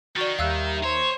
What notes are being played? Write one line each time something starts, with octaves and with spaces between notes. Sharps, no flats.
D#3 F#4 D5 A6
D#2 G3 E5 F5 A#5 E6 F#6
C5 C#5